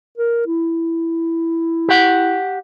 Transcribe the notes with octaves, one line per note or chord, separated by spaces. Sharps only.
A#4
E4
G4 F#5